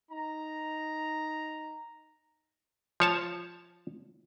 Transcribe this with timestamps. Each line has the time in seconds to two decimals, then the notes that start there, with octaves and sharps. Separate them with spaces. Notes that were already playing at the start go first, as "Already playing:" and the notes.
0.11 D#4 A#5
3.00 F3 C#5 A5